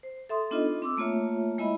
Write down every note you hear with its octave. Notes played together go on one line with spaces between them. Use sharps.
C5
A4 E5 C6 D#6
B3 D4 D#4 F4 A4 D#5
C4 D6 E6
A3 A#3 F4 C#5 E5
G#3 E4 D#5 E5 B5